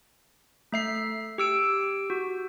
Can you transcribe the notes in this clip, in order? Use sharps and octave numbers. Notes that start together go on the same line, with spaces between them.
A3 E5 C7
G4 E6 D7
F#4